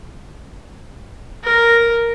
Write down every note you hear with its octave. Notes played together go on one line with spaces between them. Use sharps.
A#4